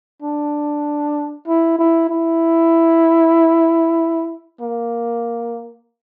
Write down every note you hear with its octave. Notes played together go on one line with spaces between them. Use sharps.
D4
E4
E4
E4
A#3